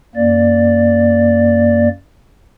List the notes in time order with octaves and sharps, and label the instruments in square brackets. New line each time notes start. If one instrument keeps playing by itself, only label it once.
[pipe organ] F#2 A#3 D5